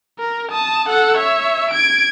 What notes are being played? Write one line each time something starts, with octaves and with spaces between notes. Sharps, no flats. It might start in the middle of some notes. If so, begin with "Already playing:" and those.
A#4
A5 D#6
A4 F#5
C#5 E5
G#6 D7